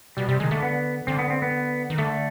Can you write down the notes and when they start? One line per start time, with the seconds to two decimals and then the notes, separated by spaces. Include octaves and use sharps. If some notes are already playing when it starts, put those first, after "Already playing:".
0.17 B2 G3
0.29 C3 G3
0.40 D#3 G#3
0.51 D3 A3
0.62 B3
1.07 D3 C4
1.19 B3
1.30 C4
1.42 B3
1.90 D#3
1.98 D3 A3